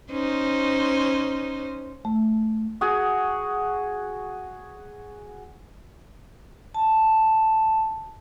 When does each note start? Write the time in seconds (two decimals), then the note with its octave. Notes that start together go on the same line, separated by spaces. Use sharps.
0.11 C#4 D#4 C5
2.05 A3
2.81 F#4 G#4
6.74 A5